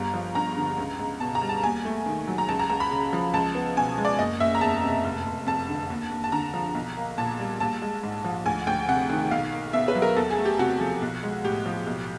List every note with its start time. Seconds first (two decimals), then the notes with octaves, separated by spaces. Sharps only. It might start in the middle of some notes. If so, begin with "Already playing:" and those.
Already playing: G1 G3 A#5
0.14 F3
0.35 G2 A#5
0.57 D3
0.78 C#2
0.99 C#2
1.20 B2 A5
1.35 A#5
1.41 G3
1.49 A5
1.63 D#2 G#5
1.85 A3
2.06 D#3
2.28 F#3
2.38 A#5
2.48 C#2 A5
2.59 A#5
2.70 C#2 A#5
2.80 B5
2.91 C#3
3.13 F3
3.33 C#2 A5
3.55 B3
3.76 B2 G#5
3.98 G#3
4.05 D5
4.19 F#1 D#5
4.40 F#1 E5
4.55 A#5
4.61 E2 A5
4.83 C3
5.05 F1
5.26 F1
5.47 F2 A5
5.69 D3
5.90 D#2
6.11 D#2
6.24 A5
6.32 D3 A#5
6.54 F3
6.75 B1
6.97 A#3
7.18 A#2 A5
7.39 G3
7.60 A#1 A5
7.82 G#3
8.03 G#2
8.25 F3
8.46 D2 G#5
8.67 D2 G5
8.88 C3 F#5
9.10 D#3
9.31 B1 F5
9.52 A#3
9.73 B2 E5
9.88 B4
9.95 F#3
10.02 A#4
10.16 E2 A4
10.31 G#4
10.38 A3
10.45 G4
10.59 C3 F#4
10.80 F3
11.02 B1
11.23 G#3
11.44 A2 G4
11.66 F3
11.87 B1